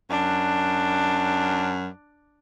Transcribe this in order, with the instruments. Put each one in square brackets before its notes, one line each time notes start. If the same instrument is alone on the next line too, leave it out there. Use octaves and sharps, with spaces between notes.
[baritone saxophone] F#2 [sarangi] D4